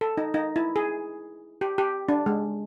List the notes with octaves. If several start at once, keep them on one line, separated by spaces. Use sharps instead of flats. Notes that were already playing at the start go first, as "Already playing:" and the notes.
A4
D#4
D#4
E4
G#4
G4
G4
D4
G#3